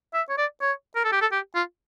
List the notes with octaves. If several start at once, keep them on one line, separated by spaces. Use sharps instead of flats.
E5
C#5
D5
C#5
A#4
A4
G4
A4
G4
F4